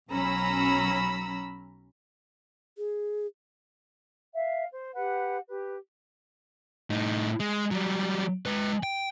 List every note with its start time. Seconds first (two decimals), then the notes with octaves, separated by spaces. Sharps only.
0.10 B1 F#3 C#4 A#5 B5 E6
2.78 G#4
4.34 E5 F5
4.72 C5
4.94 G4 B4 F#5
5.47 G4 B4
6.90 A2 D#4
7.40 G#3
7.71 F#3 G3
8.46 G#3 B4
8.83 G5